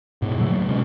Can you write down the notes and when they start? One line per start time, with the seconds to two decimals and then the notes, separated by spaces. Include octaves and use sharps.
0.22 G#2 B2
0.37 A2 C#3 F#3 A3
0.48 D2 F#3 A#3
0.68 B2 G#3 C#4